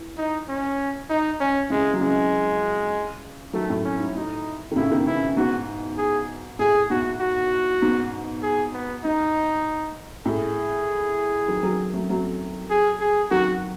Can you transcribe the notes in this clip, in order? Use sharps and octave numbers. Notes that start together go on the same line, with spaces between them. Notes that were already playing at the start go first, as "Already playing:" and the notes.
Already playing: E3
D#4
C#4
D#4
C#4
C#3 E3 G#3
F#3
C#3 E3 G#3
D#3 F#3 A3
A2
C#4
G#2
A2 D#4
D#3
A2 C#3 E4
B2 D#3
C#3 E3 E4
G#2 B2 F#4
G#4
A2 G#4
G#2 B2 F#4
F#4
G#2 B2
G#4
B3
G#2 D#4
A2 G#4
D#3 F#3
D#3 F#3
F#3 A3
F#3 A3
G#4
G#4
D#3 F#3 F#4